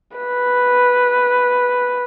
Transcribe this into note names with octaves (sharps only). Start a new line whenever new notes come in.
B4